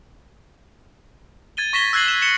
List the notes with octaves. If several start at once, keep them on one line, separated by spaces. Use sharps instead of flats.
G#6 A6 D#7 G7
C#6 A#6 B6 E7 G7
E6 F#6 G#6 C7 F#7
E7
C#7 E7 G7